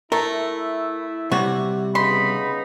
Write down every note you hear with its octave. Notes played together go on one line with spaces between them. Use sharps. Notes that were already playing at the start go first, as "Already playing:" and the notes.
A3 E4 A#4
C3 G3 F#4 C#5
C#3 B3 D#4 B5 C6